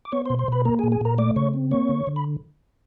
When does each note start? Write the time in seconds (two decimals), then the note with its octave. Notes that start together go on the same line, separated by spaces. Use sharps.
0.05 D6
0.12 B3 C#5 C#6
0.25 C5 C6
0.30 B2
0.39 C5 C6
0.48 B2 B4 B5
0.65 A#3 A#4 A#5
0.79 G#4 G#5
0.84 A#2
0.92 G#4 G#5
1.01 A#2 A#4 A#5
1.18 A3 D5 D6
1.36 C#3 C#5 C#6
1.54 C4
1.71 A#3 C#5 C#6
1.89 D3
2.07 D3
2.16 B5